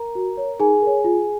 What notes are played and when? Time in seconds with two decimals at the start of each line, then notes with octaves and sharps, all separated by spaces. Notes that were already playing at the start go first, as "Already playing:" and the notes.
Already playing: A#4 A#5
0.15 F#4
0.37 C#5
0.60 D#4 G#4 G#5
0.82 A#4 C#5
1.04 F4